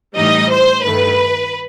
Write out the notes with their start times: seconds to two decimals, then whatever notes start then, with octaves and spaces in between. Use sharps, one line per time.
0.16 A2 E3 G3 D#4 D#5
0.50 C5
0.83 G2 D#3 A3 B4